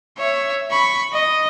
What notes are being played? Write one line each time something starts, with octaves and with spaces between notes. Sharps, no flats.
C#5 E5
B5 C#6
D#5